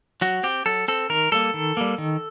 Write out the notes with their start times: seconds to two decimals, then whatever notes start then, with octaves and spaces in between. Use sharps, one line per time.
0.21 F#3 F#4
0.43 C4 G4
0.66 F#3 A4
0.88 C4 A4
1.10 D#3 A#4
1.32 G3 A#3 A4
1.54 D#3
1.77 G3 A#3
1.98 D#3